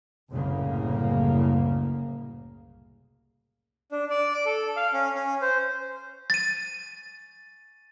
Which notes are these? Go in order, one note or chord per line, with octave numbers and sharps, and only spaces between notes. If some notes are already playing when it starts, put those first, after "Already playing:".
F#1 C2 A2 C#3 A#3
D4
D5
D6
A4
F5
C#4
C#4
C5
A6 D#7